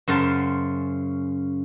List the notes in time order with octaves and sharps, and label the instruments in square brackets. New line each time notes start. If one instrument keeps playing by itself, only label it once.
[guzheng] F#2 C#3 C5 A5